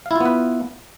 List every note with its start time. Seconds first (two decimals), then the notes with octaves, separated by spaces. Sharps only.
0.06 F5
0.11 E4
0.16 F4
0.21 B3
0.25 B4